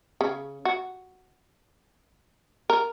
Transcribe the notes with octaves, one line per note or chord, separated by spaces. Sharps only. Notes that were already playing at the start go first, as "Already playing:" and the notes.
C#3
F#4
A#4